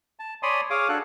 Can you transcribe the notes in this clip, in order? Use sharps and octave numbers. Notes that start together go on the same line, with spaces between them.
A5
C#5 D5 G#5 B5 C6 D#6
G#4 C#5 F5 D6 D#6
D4 F#4 A4 F#6